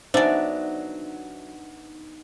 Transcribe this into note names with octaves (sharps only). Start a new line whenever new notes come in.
F#3 B3 D4 D#4 C5 D5 E5 G#5